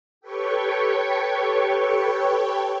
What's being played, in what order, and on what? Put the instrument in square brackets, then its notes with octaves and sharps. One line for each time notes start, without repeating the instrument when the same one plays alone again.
[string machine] G4 A4 B4 C#5 G5 C#6